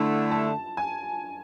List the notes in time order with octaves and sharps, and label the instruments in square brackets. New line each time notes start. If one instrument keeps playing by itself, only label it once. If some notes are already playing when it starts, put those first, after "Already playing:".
Already playing: [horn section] D3 A3 E4 [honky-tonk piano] A5
[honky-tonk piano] A5
G#5